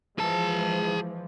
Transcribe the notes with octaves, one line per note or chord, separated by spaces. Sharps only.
E3 F3 G#3 G#4 A5